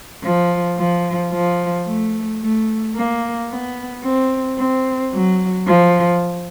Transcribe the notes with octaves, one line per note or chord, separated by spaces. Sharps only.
F3
F3
F3
A3
A3
A#3
B3
C4
C4
F#3
F3